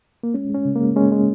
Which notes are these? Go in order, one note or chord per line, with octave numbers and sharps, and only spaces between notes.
A#3
G#3 C#4
G#3
C#4
C#3
G#3 A#3
G#3 C#4
G#3